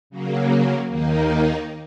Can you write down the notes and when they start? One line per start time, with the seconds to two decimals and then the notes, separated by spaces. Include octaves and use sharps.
0.10 C#3 F#3 A#3
0.89 D#2 D#3 A#3 D#4